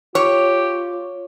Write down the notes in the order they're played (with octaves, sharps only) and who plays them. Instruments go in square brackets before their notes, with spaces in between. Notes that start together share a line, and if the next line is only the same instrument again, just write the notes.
[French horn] F4 [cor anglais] G4 [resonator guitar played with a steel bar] C#5